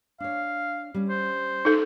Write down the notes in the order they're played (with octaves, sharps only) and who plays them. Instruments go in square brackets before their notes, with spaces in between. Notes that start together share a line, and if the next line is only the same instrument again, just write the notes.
[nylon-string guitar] D4 C#5 [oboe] F5
[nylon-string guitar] G3 C#4
[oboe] C5
[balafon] D#4 A4